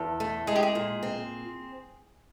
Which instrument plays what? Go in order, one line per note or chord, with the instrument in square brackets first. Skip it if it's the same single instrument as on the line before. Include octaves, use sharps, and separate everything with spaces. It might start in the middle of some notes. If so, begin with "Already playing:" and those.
Already playing: [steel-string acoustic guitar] E2 [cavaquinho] A4
[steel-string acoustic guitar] A3
[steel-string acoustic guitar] G#3 [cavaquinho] G#4
[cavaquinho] G4
G#4
[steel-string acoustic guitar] A#2
C4